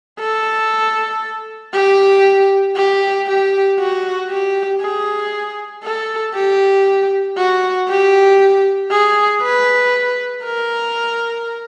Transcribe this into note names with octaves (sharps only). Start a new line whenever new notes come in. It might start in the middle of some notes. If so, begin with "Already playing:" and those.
A4
G4
G4
G4
F#4
G4
G#4
A4
G4
F#4
G4
G#4
B4
A#4